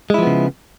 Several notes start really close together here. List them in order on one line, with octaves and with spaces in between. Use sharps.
G#3 E4 F3 B3 C#3